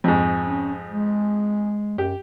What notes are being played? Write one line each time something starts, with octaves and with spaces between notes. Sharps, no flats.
F2 G#2
C#4
G#3
F#2 G4